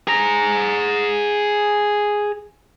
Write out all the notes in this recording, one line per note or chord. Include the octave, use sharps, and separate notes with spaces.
G#4 A#5